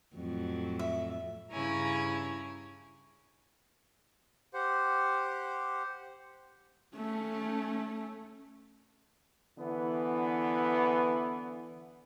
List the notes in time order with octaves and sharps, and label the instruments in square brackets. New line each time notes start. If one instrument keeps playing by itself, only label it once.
[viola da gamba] F2 A2 F#3
[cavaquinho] E5
[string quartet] G2 C#3 E4 C#5 G#5 A#5
[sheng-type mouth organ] G4 C5 F#5
[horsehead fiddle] A3 C#4
[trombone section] D3 E3 B3